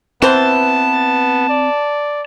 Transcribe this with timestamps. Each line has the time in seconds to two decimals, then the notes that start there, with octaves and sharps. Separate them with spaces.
0.22 E3 B3 C4 C5 A5
1.49 D5